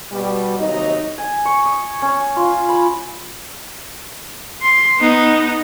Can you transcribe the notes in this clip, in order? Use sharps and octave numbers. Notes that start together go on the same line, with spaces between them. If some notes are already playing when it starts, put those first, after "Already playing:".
B2 G3
D#2 C3 F#3 D#4 D#5
G#5
C#6
D#6
C#4
F4
B5
C6
B3 D#4